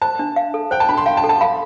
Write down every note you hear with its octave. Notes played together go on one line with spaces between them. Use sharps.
C5 A5
D4
F5
A4
C5 G5
A5
D4 B5
C6
F5 G5
A5
A4
A5
F5 B5